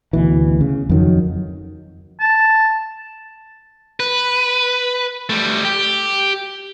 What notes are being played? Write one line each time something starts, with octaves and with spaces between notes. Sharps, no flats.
D2 B2 E3
C#3
F2 D#3 F#3
A5
B4
G3 A3
G4